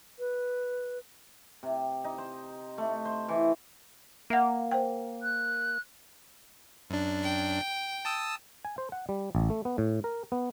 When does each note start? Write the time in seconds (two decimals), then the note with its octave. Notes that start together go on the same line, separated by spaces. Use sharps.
0.19 B4
1.63 C3
2.04 D#4
2.18 C5
2.78 A3
3.05 C5
3.28 E3
4.30 A#3 E5 F#5
4.71 C5 G5
5.23 F#6
6.90 F#2 D4
7.22 G5
8.05 A5 D#6 E6
8.65 G#5
8.78 C5
8.92 F#5
9.09 G3
9.35 A1
9.50 A3
9.65 B3
9.78 A2
10.04 A#4
10.32 B3